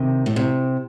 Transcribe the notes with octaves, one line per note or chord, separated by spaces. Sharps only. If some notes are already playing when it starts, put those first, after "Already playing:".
Already playing: C3 D#3
A2
C3